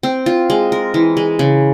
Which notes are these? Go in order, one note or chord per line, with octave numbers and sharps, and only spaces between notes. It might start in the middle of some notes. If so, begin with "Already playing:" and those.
C4
F4
G#3
A#4
E3
G#3
C#3